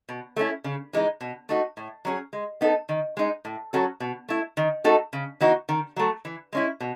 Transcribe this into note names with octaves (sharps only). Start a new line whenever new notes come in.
B2
A3 C#4 E4
C#3
E3 G#3 D#4
B2
A3 D#4 F#4
A2
F#3 C#4 G#4
G#3
B3 D#4 A4
D#3
G#3 D#4
A2
F#3 C#4 F#4 A4
B2
A3 E4
D#3
A3 D#4 F#4 A4
C#3
E3 B3 D#4 F#4
D#3
F#3 A3
E3
G#3 C#4 E4
B2